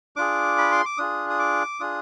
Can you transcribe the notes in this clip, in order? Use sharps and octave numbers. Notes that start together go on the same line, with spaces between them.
D4 F4 G#4 D6
B5
C6
D6
D4 F4 G#4 D#6
D#6
D6
D4 F4 G#4 D#6